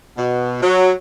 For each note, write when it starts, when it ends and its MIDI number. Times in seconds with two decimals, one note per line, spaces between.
0.18 0.62 47
0.63 0.92 54